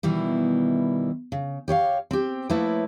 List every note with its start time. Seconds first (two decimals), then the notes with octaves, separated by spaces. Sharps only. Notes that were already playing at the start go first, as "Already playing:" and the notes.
0.03 B2 D#3 E3 G3 E4
1.32 C#3
1.68 G4 C#5 D5 F5
2.11 C4 G4
2.50 F3 A3 A#3 E4 B4 C#5